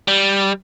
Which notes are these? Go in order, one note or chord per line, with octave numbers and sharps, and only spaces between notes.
G3